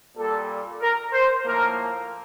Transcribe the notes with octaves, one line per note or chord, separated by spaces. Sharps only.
A#2 G3 A#3 A4
A#4
C5
A2 F3 A#3 A#4